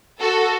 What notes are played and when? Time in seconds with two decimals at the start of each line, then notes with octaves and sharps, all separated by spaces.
0.19 F#4 A4